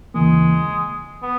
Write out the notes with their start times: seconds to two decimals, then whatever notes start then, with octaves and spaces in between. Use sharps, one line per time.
0.14 D#2 C#3 E3 G#3 A#3
1.23 B3